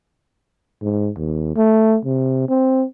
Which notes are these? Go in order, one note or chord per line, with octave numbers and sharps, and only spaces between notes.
G#2
D#2
A3
C3
C4